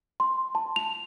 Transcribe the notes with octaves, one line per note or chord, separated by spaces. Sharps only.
C6
A5
F7